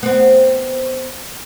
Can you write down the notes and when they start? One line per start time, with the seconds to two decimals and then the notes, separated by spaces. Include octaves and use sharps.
0.03 B3 C4